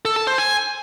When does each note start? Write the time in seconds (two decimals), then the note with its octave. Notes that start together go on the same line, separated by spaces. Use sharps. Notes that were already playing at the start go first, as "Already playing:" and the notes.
0.05 A4
0.16 A5
0.27 C5
0.38 G#5